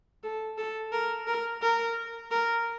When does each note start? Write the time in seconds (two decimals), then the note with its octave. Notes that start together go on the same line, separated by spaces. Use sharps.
0.23 A4
0.58 A4
0.92 A#4
1.27 A#4
1.62 A#4
2.31 A#4